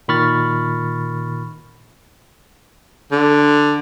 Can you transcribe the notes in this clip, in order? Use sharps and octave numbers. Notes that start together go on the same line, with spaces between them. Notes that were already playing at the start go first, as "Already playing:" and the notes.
A#2 D#3 B5 C#6 F6 A6
D3